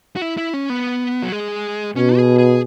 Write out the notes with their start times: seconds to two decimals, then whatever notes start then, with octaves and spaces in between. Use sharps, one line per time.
0.16 F#4
0.22 E4
0.37 E4
0.54 C#4
0.70 B3
1.22 F#3
1.32 G#3
1.96 B2 C#4
2.17 G#4
2.38 G#4